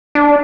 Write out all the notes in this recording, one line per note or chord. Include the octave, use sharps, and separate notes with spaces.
D4